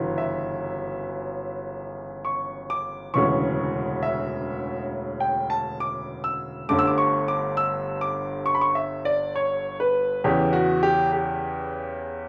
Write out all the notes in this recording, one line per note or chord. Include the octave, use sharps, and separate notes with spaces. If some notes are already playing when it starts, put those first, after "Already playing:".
Already playing: G1 F#2 C#3 E3
E5
C#6
D6
E1 D2 C#3 E3 C#6
E5
G5
A5
D6
E6
G1 G2 D3 A3 D6
E6
D6
C#6
D6
E6
D6
C#6
B5
C#6
E5
D5
C#5
B4
E2 C#3 E3 G4
F#4
G4
G4